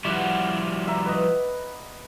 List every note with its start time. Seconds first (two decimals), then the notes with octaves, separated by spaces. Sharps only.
0.05 F3 G3 E4 D5 F#5
0.87 E5 A#5
1.05 B4 D#5